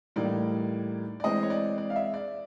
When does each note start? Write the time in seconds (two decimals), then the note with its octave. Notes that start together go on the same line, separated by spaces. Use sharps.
0.16 A2 E3 G3 A#3 D#4 D5
1.20 D5
1.24 E3 G#3 C4 D#5
1.43 C#5
1.50 D5
1.78 D5
1.90 F5
1.96 E5
2.14 D5